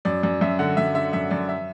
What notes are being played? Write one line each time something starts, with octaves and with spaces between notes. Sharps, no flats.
F#2 D5
F#2 D5
F#2 E5
D3 F#5
F#2 E5
D3 E5
F#2 E5
F#2 D5
E5